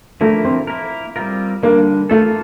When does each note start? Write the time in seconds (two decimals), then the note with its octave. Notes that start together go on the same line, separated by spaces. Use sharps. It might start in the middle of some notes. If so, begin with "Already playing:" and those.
0.21 D3 F3 A3 A#3 E4 A#4
0.45 C4
0.67 A#3 E4 A#4
1.16 G3 C4 F4 A#4
1.63 D3 G3 A#3 D4
2.10 A3 A#3 F4 A4